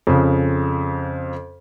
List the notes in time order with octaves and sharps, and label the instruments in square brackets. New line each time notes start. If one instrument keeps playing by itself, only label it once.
[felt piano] F2 C#3